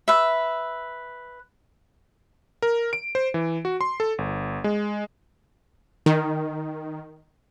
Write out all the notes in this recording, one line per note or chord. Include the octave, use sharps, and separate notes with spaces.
B4 E5
A#4
D7
C5
E3
F#4
C6
A4
G1
G#3
D#3